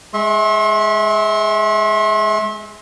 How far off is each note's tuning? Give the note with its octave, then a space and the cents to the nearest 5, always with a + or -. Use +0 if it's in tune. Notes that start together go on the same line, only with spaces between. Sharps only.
G#3 +0 E5 -25 C6 +40